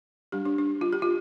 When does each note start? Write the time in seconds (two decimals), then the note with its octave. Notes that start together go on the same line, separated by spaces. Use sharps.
0.32 G3 D4 G4
0.45 D4
0.58 D4
0.81 F4
0.93 G4
1.02 F4